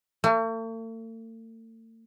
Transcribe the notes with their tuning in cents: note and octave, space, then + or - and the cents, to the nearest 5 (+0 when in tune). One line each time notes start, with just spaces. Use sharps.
A3 +45